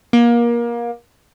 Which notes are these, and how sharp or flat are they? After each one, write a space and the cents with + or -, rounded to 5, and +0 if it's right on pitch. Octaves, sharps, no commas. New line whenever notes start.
A#3 +25